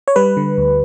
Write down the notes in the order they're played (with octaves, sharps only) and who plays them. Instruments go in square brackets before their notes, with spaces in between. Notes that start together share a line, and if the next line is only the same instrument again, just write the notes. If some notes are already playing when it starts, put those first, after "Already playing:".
[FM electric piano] C#5
G3 B4
D3
D2